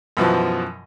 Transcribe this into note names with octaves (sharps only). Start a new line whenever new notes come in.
F#2 B2 E3 F3